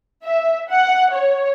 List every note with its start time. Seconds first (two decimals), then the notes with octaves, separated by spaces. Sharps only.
0.24 E5
0.70 F#5
1.14 C#5